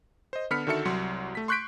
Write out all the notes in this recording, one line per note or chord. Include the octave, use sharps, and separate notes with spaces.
C5 D#5
D3 B3 B5 F6 B6 C#7
D3 D#3 F#4 A4 E5 C#7
C2 F#3 C6
A3 B6
C6 C#6 F#6 G6 B6 D7